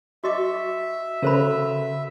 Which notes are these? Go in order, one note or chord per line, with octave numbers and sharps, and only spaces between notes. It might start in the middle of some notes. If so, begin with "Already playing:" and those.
F#4 D#5 E5 C#6 D6
C#3 F#4 A4 A#4 C5 B5